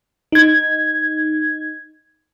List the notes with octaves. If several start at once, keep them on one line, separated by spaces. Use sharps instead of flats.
D#4 G#6